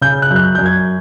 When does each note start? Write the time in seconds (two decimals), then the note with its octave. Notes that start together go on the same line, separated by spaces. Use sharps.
0.01 C#3 G6
0.22 F#6
0.31 F#2
0.36 F#6
0.43 G6
0.55 F#2 G6
0.66 G#6